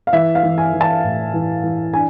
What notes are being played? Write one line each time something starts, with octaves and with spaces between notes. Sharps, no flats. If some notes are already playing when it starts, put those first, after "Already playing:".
F5
E3 E5
F5
E3
G#5
E3
A5
A2
E3
E3
D4 G#5